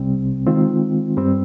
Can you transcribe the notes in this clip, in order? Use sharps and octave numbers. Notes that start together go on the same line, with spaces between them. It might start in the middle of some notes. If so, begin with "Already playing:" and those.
Already playing: C2 C3 G3 C4
D#3 G#3 C4 F4
G2 G3 C4